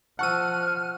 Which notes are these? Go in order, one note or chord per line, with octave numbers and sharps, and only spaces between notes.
F3 F#5 A5 C#6 E6 F6 D#7